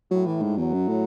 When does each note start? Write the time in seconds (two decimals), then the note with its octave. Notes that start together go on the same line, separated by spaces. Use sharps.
0.11 A2 F#3
0.26 E3
0.42 G#2
0.57 E2 F#3
0.73 F#2
0.88 A2